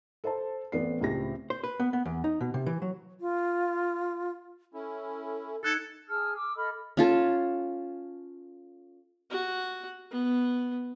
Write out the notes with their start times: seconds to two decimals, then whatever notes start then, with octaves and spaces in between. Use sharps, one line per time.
0.24 A4 C5 A5
0.72 A1 B3 C4 A4 D5 C7
1.01 C#2 A2 C4 G4 A#6
1.50 C5
1.64 B4
1.80 B3
1.93 B3
2.05 E2
2.24 D#4
2.41 B2
2.54 C3
2.66 E3
2.82 F#3
3.20 F4
4.74 C#4 E4 A4
5.64 D#4 A4 F#6 G#6 C#7
6.08 G#4 A5 E6 F6
6.36 D6 E6
6.56 A4 D#5 B5 F6
6.97 C#4 F4 A4
9.30 F#4
10.10 B3